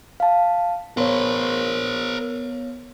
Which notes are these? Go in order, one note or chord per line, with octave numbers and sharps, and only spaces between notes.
F5 A5
B3 A#4 C5 C#5